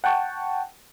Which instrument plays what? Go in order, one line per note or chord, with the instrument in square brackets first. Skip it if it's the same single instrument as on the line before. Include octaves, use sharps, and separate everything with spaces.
[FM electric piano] F#5 G5 A5 C#6